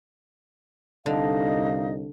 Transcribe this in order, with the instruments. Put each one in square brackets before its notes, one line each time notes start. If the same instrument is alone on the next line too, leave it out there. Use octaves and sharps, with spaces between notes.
[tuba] C2 [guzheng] D3 [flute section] D#4 D#5 [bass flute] F5